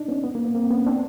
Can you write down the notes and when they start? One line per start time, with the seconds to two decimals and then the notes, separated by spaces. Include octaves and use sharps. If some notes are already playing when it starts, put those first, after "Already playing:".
Already playing: D4 D#4
0.08 B3 C#4
0.24 B3
0.35 A#3
0.45 B3
0.55 A#3 C4
0.70 B3 C#4
0.86 C4 D4